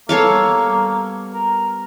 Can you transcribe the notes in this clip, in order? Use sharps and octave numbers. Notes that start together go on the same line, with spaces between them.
G3 A#3 B3 A4 C#5 F5
A#4